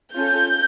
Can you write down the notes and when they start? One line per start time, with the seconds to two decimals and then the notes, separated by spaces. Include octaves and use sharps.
0.15 C#4 F4 A4 G6